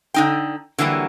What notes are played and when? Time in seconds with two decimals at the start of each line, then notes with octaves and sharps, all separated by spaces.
0.14 D3 D#4 G5
0.78 D3 E3 F#3 G3 A#3